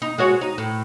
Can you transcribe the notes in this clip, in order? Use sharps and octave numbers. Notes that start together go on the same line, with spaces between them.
D#4
G#3 F#4 C#5
D#4
A2